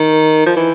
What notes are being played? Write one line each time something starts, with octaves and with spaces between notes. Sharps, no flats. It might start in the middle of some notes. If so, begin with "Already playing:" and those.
Already playing: D#3
F3
E3